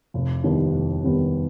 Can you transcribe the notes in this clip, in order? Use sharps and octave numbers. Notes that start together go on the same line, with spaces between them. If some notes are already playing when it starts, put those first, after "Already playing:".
F1
D#2 D#3 G3 B3
F1
D#2 D#3 G3 B3